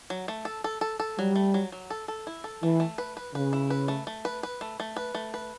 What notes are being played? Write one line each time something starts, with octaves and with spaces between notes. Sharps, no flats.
F#3
A3
A4
A4
A4
A4
F#3 G3
A3
F#3
F#3
A4
A4
E4
A4
E3 A3
A3
B4
B4
C#3 B4
E4
B4
A3
A3
B4
B4
A3
A3
B4
A3
B4